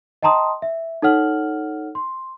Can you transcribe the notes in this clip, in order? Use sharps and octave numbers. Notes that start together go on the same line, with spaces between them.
D#5 G5 A5 A#5 C6 D#6
E5
D#4 A4 C#5 F#5 F6 F#7
C6